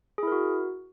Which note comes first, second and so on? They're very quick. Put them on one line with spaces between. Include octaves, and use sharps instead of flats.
G#4 E4 A#4 F#4